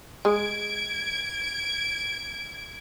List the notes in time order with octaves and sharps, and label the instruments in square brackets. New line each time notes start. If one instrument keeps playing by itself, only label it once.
[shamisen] G#3 [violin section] G#6 D7